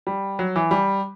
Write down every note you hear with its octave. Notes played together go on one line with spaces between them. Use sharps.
G3
F#3
E3
G3